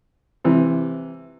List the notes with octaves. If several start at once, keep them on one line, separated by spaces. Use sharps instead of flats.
C3 E3